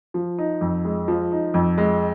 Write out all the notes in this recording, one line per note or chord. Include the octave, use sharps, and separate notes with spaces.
F3
D#4
F2
G#3
F3
D#4
F2
G#3